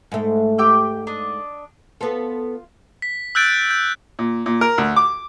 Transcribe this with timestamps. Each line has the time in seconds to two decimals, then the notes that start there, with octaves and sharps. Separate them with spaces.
0.12 G#2 A3
0.58 G4 G5 E6
1.07 D4 D#5
2.01 B3 F4 A4
3.02 B6
3.35 E6 F#6 G6 A6 D7
3.71 G6
4.19 A#2
4.46 A#2
4.61 A#4
4.78 D2
4.96 D6